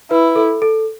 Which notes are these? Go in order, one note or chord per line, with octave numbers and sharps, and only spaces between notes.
E4 B4
A4
A4